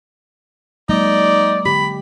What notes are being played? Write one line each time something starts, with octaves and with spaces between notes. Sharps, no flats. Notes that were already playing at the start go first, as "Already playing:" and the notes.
F#3 G#3 A#3 D#4 D5
D3 G4 B5